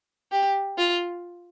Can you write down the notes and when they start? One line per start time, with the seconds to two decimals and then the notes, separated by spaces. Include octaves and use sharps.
0.32 G4
0.78 F4